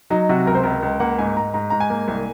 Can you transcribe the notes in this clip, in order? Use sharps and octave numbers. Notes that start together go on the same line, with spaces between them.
F#3 D#4
C3 F#4
C#2 A#4
C5
C#2 A#4
C#2
A#3 F#5
G#2 G#5
G#2 A#5
G#2 A#5
G#2 A#5
G#5
A#3
C2